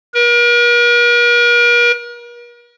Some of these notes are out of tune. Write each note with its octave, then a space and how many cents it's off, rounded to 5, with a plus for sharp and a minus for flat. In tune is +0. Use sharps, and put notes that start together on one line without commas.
A#4 +45